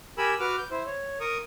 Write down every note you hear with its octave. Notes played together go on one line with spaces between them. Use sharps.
G4 A#4 G#5 B5 E6
F#4 B4 D6 F6
G6
E4 C5
C#5
A#4 C#6 D#6